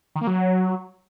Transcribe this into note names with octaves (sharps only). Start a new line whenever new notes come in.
D#3
A#3
F#3